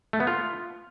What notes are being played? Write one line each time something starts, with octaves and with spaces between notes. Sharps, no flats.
A3
B3
F4